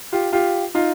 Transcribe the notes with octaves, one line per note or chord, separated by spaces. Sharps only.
F4 G4
F4 G4
D#4 F4